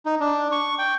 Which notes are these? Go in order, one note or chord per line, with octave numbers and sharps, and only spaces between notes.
D#4
D4
C#6
G5